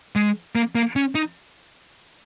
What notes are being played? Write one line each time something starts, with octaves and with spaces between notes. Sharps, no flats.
G#3
A#3
A#3
C#4
D#4